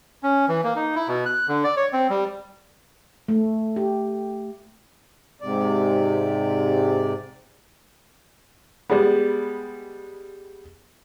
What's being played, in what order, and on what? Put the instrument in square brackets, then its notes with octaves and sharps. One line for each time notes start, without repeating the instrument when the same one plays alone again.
[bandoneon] C#4
E3
A#3
D#4
E4
B2
F#6
D3
D5
C#5
C4
G3
[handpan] A3
G4
[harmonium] G#2 C3 D5
[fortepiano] G3 G#3 B3